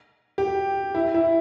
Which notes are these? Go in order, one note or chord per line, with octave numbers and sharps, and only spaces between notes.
G4
E4
E4